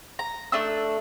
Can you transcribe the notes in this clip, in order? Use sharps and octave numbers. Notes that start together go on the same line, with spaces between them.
A#5
A3 D4 E6